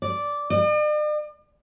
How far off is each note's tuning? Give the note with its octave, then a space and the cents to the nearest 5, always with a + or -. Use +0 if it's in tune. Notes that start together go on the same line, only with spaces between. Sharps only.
D5 -10
D5 +45